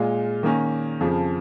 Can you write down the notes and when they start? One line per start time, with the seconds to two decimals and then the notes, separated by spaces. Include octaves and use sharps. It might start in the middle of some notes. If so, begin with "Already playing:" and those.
Already playing: A#2 G#3 F4
0.43 D#3 A#3 C#4
1.01 F2 C#3 F3